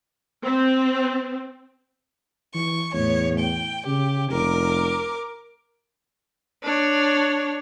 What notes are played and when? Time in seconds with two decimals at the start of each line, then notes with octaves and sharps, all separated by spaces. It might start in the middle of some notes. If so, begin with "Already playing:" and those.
0.43 C4
2.54 E3 C#6
2.94 E2 A2 C#5
3.39 G5
3.87 C#3 G4
4.31 F1 A#4 D6
6.63 D4 C#5